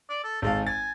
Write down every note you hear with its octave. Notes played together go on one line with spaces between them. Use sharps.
D5
A4
G#1 G#3 A4 F5
G#5 A6